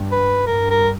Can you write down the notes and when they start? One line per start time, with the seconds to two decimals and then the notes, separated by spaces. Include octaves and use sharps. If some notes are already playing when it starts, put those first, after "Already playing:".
Already playing: G2
0.12 B4
0.46 G2 A#4
0.70 A#4